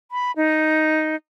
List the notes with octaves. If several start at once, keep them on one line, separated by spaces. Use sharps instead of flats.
B5
D#4